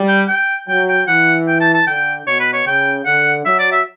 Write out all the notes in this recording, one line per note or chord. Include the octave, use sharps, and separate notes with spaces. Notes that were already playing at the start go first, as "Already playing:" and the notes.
Already playing: G3
G5
G5
F#3 G5
G5
E3 F#5
G5
A5
A5
D3 G5
B2 C#5
B4
C#5
C#3 G5
D3 F#5
F#3 E5
D5
E5